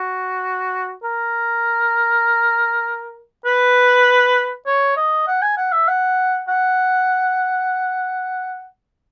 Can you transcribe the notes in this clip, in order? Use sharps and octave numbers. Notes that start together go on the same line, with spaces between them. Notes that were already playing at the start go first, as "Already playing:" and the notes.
Already playing: F#4
A#4
B4
C#5
D#5
F#5
G#5
F#5
E5
F#5
F#5